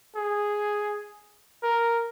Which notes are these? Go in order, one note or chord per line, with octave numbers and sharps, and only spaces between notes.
G#4
A#4